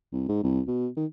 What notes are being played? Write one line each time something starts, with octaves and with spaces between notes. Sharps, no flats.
C2
G#2
C2
B2
D#3